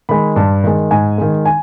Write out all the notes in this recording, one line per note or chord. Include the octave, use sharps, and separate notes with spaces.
D#3 G#3 B5
G2 A5
D#3 G#3
G#2 G#5
D#3 G#3
G#5